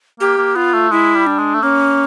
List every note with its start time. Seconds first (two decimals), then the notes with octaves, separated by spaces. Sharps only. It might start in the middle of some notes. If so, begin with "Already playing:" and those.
0.20 A#3 G4
0.38 A#3
0.56 B3 F4
0.73 A3
0.91 G#3 E4
1.15 G3
1.27 D4
1.38 G#3
1.54 A3
1.62 A#3 C#4